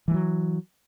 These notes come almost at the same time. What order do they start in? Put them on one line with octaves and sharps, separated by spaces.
E3 G3 F#3